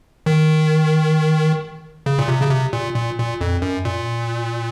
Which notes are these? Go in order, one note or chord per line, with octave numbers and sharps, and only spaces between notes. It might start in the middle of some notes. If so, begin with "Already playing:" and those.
D#3
C#3
A#2
C3
C#3
C3
A#2
A#2
A#2
F2
F#2
A#2